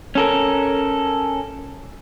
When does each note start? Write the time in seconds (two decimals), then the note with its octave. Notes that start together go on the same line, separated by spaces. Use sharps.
0.15 C#4 A4 A#4